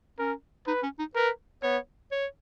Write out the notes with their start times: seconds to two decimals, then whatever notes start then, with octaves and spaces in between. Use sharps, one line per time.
0.19 C#4 A#4
0.67 D#4 B4
0.83 C#4
0.99 D#4
1.15 A#4 B4
1.63 B3 C#5
2.12 C#5